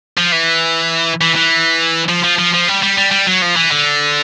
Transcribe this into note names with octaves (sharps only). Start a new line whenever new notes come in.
F3
E3
E3
E3
F3
F3
F3
F3
G3
G3
G3
G3
F#3
F3
E3
D3